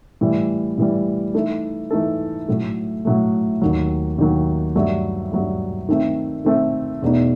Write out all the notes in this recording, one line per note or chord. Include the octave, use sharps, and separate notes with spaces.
A2 E3 G3
A2 E3 G3
E3 A3 D#4 A4
E3 A3 D#4 A4
A2 F#3 A3
A2 F#3 A3
D#2 D#3 F#3
D#2 D#3 F#3
G2 F#3 A3
G2 F#3 A3
D#3 A3 C4
D#3 A3 C4
E2 B2 A3 D#4